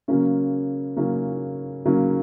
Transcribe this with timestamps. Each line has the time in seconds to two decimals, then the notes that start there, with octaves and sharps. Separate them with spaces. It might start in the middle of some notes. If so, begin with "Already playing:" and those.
0.08 C#3 F#3 A#3 C#4
0.96 C#3 F#3 A#3 C#4
1.85 C#3 F#3 A#3 C#4